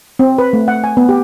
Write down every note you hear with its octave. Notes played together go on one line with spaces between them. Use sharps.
C4
B4
A3
F#5
G#5
B3
G4